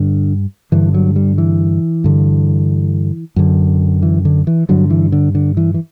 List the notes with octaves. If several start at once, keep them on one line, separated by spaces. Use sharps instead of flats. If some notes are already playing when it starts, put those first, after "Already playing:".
Already playing: G2 D3
G2 D3 E3
F#3
G3
E3
G2 D3
F#2 D3
E3
D3
E3
G2 D3 F#3
E3
D3
D3
E3
E3